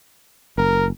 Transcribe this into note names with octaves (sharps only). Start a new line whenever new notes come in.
F#1 A#4